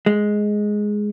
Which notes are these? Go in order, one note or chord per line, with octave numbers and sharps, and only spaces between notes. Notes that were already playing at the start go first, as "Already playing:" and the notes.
G#3